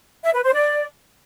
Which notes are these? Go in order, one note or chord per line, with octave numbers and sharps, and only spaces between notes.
E5
B4
C5
D5